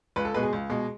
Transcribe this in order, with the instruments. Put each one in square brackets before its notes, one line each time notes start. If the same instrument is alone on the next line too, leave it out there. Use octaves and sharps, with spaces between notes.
[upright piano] C#2 B4
A4
B2 G#3 B4
G#4
C#2
B2 G#3